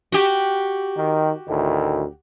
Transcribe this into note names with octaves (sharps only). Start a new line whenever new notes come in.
F#4 G4
D#3
D2 A2 D#3